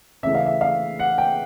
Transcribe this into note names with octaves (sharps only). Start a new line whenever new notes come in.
C#3 E3 A3 E5
F5
E5
F5
F#5
G5